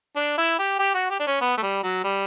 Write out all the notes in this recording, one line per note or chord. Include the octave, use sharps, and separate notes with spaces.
D4
E4
G4
G4
F#4
G4
D4
C#4
B3
A3
G3
F#3
G3